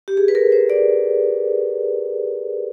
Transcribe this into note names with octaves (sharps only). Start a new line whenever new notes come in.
G4
G#4
B4
A#4
C5
D5